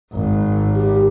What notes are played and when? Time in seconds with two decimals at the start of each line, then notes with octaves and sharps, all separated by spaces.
0.13 G#1
0.76 G4